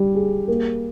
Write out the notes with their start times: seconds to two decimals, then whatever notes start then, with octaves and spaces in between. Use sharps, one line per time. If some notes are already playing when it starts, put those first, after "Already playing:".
Already playing: G3
0.15 G#4
0.48 A#3